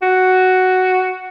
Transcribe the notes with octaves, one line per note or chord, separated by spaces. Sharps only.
F#4